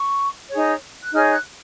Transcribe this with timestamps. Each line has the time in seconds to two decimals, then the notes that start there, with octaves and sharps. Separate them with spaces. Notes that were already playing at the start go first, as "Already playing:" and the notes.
Already playing: C#6
0.50 D#4 G#4 C#5
1.04 F#6
1.12 D#4 G#4 C#5 F6
1.32 F#6